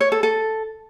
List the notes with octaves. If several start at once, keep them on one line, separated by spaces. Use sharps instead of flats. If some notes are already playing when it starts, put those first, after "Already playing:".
C#5
A4
A4